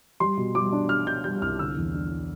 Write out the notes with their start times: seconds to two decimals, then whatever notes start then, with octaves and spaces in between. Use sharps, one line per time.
0.20 G3 C6
0.37 B2
0.55 G3 D6
0.72 D4
0.89 D4 F6
1.07 D4 G6
1.24 G3 G6
1.42 C2 F6
1.59 D3 E6
1.77 E2
1.94 D4